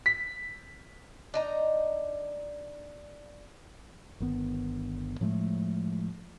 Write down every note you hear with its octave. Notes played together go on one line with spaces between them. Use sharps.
B6
D4 D#4 A#5
G1 D#3 B3
A2 F3 G#3 A3